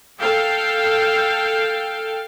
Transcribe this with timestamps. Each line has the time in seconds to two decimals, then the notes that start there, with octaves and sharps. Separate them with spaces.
0.18 A4 F5 G5